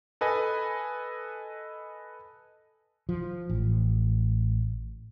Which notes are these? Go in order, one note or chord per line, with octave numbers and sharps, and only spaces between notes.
A4 B4 D#5 G#5
F3
A1